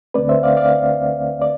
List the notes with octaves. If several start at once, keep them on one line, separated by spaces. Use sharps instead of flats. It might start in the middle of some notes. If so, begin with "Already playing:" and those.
D2 D3 A3 C4 B4 D5
C5 E5
D5 F5
D5 F5
D5